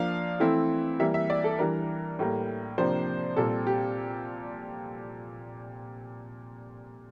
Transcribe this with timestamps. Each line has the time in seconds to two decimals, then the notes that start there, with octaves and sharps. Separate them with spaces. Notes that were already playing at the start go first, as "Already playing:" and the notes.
Already playing: F3 A#3 D4 F5
0.40 E3 A3 C4 E4
1.00 E3 G3 A#3 E5
1.14 E5
1.30 D5
1.44 A4
1.59 E3 G3 D4 A#4
2.19 A2 G3 A#3
2.78 C3 F3 A#3 D4 C5
3.37 A#2 G3 C4 A4
3.67 G4